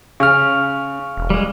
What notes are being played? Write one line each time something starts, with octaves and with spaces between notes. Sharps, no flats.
C#3 C#4 C#6 F6
E1
G3 G#3